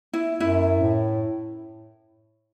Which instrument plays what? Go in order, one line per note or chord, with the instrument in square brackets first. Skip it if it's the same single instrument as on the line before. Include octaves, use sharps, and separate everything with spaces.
[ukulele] E4
[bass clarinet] F#2 [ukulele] E4
[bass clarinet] A2